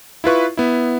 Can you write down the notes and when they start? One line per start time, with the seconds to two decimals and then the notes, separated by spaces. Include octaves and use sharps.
0.24 E4 F4 B4 C#6
0.57 B3 E4